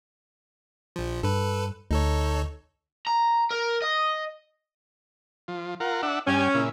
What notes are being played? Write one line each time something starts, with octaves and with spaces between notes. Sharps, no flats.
A#1 F3
G2 A4 B4
D2 D#4 A4 C#5
A#5
A#4
D#5
F3
F4 A#4 F#5
D4 E5 F#5
G2 C#4 G5 G#5
A#2 C#3 E4